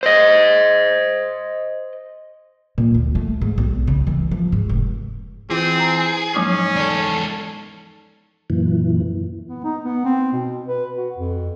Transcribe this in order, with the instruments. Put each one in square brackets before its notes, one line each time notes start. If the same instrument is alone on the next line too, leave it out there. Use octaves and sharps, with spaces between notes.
[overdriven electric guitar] C5 D#5
[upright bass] A#2
D2
A3
G#2
B1
C#3
E3
F3
G#2
F1
[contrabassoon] E3 [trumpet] C4 [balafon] F4 [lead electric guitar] G#4
[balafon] A#5
[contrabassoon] G#2 [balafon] F3 F#3 A#3 [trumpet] C#4
[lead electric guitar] E2 A4 [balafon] C#5 D5
[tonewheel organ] F#2 A#2 E3
[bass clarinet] B3
D#4
B3
C4
B2
B4
F#4
F2